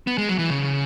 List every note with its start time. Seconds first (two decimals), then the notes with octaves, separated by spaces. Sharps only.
0.07 B3
0.18 G#3
0.29 F#3
0.39 E3
0.50 C#3